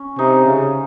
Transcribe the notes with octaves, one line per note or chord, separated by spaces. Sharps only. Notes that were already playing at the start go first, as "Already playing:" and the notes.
Already playing: C#4
C3 D#4
C#3